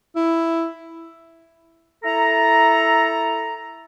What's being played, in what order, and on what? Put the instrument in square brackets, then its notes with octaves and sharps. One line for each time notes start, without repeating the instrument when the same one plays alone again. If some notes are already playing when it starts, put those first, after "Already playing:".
[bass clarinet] E4
[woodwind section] E4 A4 A#5